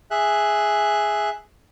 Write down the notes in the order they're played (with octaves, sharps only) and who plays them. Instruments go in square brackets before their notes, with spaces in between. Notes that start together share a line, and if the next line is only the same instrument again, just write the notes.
[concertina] G#4 E5 F#6